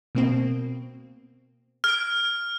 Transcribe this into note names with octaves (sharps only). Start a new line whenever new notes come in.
B2 A#3 C4
F6 G#6 D7